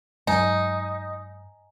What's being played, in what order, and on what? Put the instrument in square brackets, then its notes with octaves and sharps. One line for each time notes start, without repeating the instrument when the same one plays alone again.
[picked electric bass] G2 F#3 G#3 [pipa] D#4 [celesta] D#5 G#5 A#5